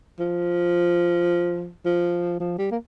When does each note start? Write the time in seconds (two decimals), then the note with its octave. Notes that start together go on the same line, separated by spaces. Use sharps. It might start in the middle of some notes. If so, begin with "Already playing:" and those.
0.19 F3
1.85 F3
2.40 F3
2.58 G3
2.72 A#3